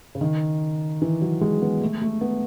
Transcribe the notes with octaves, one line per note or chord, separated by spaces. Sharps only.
C#3
D#3
E3
F#3
G#3
B3
A3
A3
B3